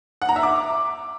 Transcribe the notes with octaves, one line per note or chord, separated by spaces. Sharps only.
F#5
A#5
E5
D6